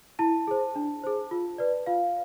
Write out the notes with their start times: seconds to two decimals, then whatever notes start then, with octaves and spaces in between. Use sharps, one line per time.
0.19 E4 A5
0.48 G#4 C5
0.76 D4
1.04 G#4 C5
1.31 F4
1.58 B4 D5
1.86 F4 F5